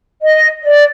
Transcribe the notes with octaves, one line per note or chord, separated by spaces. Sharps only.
D#5
D5